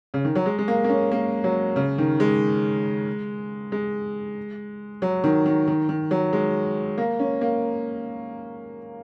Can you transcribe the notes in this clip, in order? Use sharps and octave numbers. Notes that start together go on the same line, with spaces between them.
C#3
D#3
F#3
G#3
G#3
A#3
A#3
C#4
A#3
F#3
C#3
D#3
G#3
G#3
F#3
D#3
D#3
D#3
D#3
F#3
G#3
A#3
C#4
A#3